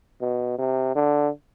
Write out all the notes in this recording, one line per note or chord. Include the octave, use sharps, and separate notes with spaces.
B2
C3
D3